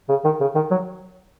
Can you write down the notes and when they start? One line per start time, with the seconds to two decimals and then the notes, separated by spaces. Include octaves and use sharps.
0.09 C#3
0.24 D#3
0.40 C#3
0.55 D#3
0.71 F#3